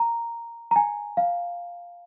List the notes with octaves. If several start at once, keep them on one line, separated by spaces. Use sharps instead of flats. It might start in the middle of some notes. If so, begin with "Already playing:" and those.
Already playing: A#5
A#5
G#5
F5